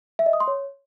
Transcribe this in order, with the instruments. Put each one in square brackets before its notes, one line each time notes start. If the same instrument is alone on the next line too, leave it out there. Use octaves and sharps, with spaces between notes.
[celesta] E5
D#5
D#6
C6
C#5